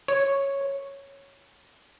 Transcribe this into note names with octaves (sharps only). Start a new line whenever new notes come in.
C#5